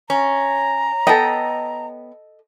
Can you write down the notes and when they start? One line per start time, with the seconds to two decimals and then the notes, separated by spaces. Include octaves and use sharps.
0.10 C#4 A#5
1.07 B3 A4 D#5 G5